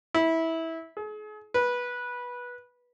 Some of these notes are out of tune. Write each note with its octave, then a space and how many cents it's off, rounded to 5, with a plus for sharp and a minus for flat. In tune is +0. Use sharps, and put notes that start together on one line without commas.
E4 -20
G#4 +40
B4 -15